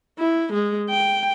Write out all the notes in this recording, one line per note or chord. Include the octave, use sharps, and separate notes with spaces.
E4
G#3
G5